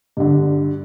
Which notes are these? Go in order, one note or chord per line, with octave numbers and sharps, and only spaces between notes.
G2 D3